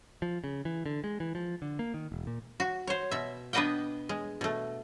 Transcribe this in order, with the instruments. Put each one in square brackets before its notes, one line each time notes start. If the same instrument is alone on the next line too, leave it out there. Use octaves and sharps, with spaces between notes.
[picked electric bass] F3
C#3
E3
D3
G#3
E3
F3
D3
A#3
D#3
E1
A#2
[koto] F#4
C5 C#5
B2 E5
B3 D4 B4 D#5 F#5 G5
G#3
B2 A3